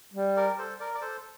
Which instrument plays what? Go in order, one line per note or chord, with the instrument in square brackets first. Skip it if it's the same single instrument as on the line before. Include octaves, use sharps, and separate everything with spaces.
[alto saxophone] G3
[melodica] A#4 D5
A4 C5
A#4 D5
D5
A4 C5